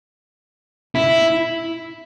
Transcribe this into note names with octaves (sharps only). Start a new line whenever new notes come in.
E4